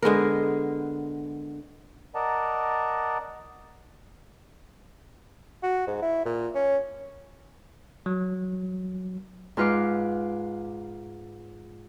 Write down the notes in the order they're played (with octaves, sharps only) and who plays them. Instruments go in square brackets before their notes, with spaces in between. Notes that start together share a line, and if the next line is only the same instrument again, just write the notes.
[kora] D3 G#3 B3 A#4
[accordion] A#4 D5 D#5 F#5 A5 A#5
[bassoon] F#4
G#2
E4
A#2
C#4
[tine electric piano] F#3
[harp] G#2 F4 B4 F5 D6